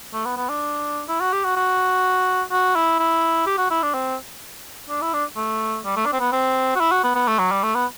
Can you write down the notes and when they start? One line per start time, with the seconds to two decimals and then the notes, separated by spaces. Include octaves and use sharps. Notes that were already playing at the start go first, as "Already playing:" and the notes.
0.14 A3
0.25 B3
0.37 B3
0.49 D4
1.08 E4
1.20 F#4
1.33 G4
1.44 F#4
1.57 F#4
2.51 F#4
2.75 E4
2.99 E4
3.47 G4
3.58 F#4
3.70 E4
3.83 D4
3.94 C4
4.89 D4
5.01 E4
5.13 D4
5.37 A3
5.85 G3
5.96 A3
6.06 D4
6.13 C4
6.20 B3
6.32 C4
6.76 F#4
6.80 E4
6.92 F#4
7.04 B3
7.15 B3
7.28 A3
7.39 F#3
7.51 G3
7.63 A3
7.75 B3